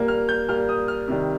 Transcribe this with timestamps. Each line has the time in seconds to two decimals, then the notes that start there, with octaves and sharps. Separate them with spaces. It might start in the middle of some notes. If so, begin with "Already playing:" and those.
Already playing: A#2 G3 A#3
0.08 F6
0.29 G6
0.48 A#2 G3 A#3 F6
0.69 D#6
0.88 F6
1.08 C3 D#3 G3